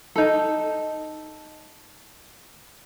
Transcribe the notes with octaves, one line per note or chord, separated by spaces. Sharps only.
D#4 A4